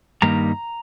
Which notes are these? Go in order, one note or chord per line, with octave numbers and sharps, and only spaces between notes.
G2 D#3 G3 A#3 D#4 A#5